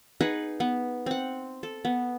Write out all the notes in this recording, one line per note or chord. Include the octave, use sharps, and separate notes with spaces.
D#4 G#4 B4 F#5
B3
C4 F#5
A4
B3